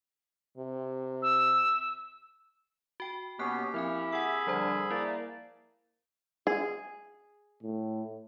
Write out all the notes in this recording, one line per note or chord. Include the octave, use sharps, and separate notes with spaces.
C3
E6
F#4 G5
B2 A#3 B3 C#4 G4 F#6 C7
F3 C4 E4 G#5 F6
G#4 E5 F#5 B5 E6
D3 F3 G3 C5
A#3 E4 D5
G#4
A2